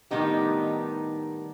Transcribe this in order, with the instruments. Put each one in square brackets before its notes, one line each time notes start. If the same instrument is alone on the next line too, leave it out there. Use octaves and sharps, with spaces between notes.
[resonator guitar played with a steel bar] A2 D#3 G3 B3 D#4 G4